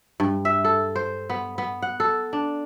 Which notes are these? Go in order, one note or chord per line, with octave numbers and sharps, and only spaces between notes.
G2
E5
A4
C5
B3
B3
F#5
A4
D4